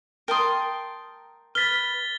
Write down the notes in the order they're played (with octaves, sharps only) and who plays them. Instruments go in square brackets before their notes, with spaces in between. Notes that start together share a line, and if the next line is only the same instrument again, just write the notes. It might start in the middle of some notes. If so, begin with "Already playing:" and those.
[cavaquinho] A#4 A5 D#6 [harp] G5 C6
[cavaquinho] B4 [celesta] F6 B6 [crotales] A6 G7